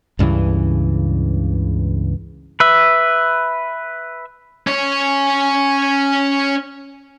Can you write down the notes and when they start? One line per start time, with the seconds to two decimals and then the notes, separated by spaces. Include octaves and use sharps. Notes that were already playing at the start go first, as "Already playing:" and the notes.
0.19 C#2 G2 C#3 E3
2.60 B4 E5
4.67 C#4 C#5